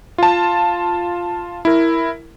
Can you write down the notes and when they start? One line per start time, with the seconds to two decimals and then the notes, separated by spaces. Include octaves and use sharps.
0.18 F4 A5
1.65 E4 A#4